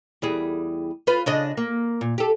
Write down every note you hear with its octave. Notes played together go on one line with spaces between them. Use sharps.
E2 G3 G#4
F4 B4
C#3 D4 D#5
A#3
A#2
G4 A4